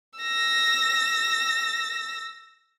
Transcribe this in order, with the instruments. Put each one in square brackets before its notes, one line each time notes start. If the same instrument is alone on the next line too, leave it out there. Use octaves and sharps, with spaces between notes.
[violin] E6 A#6